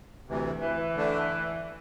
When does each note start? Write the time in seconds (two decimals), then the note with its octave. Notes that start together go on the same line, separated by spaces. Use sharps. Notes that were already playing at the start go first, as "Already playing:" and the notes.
0.28 D2 C3 E3
0.61 E3
0.95 D3 A3 D4